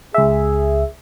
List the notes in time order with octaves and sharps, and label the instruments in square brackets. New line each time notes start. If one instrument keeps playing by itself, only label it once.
[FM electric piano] C#2 E5 [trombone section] G#4